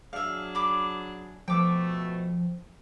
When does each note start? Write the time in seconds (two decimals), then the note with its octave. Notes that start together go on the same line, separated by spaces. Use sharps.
0.13 F#3 D4 G#4 E5 F5
0.55 B5 D6
1.48 B2 F3 A3 G5 D6